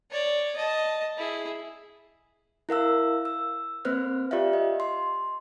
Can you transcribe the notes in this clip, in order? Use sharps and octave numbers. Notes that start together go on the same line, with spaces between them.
C#5 D5
D#5 A5
E4 G#4
E4 A#4 F5 E6
E6
A#3 C4 B4 C5 F6 F#6
F4 G4 D5 E5 F5
D#5
C6